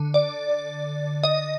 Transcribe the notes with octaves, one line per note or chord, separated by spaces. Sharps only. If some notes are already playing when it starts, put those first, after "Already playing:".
Already playing: D3
D5
D#5